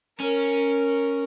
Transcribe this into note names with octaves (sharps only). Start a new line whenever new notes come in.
C#4 A#4